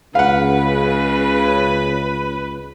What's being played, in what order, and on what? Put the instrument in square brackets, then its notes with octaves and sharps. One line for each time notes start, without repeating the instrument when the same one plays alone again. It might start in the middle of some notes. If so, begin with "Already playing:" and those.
[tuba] C#2 [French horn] C#3 [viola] B4 [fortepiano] F5 F#5